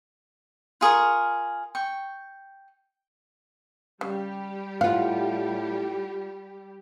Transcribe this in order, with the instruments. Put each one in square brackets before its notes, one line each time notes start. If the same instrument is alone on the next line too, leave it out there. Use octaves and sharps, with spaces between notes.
[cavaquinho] F4 G#4 A#4 C#6
G5 C#6
[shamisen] C#3 [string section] G3 G4
[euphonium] A2 [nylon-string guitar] F4 F#5 [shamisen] F5